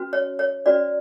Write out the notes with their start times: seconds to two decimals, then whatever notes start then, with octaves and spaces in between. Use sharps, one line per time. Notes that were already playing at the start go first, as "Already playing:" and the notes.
Already playing: C#4 F#4 B4
0.13 C#5
0.39 C#5
0.66 C#4 F#4 B4 D5